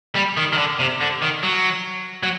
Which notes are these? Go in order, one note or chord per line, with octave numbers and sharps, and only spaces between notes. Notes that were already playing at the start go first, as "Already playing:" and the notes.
G3
D#3
D#3
D3
C3
D3
D#3
F#3
F#3